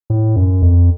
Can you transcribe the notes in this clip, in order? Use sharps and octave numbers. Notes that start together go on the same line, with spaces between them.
A2
F#2
F2